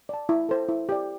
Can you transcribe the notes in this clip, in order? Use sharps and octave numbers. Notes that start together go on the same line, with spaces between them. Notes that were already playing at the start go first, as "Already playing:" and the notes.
D5 A5
E4
A4 C5
E4
G4 D5